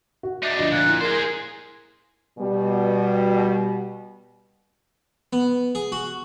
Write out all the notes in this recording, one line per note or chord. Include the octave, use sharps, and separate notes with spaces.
F#4
D4 D#4 E5
D2 F3 D#5
A#2 F#6
E4
G#4 A#4 C5
B2 G3
B3
G#4
F#4